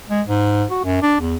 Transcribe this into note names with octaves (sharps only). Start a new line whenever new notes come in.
G#3
G#2
F#4
F#2
D4
E2